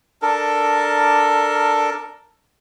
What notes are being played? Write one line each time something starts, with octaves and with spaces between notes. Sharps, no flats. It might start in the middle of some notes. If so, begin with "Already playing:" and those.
D4 A4 A#4